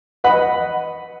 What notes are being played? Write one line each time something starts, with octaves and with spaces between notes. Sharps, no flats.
B4 D#5 F#5 B5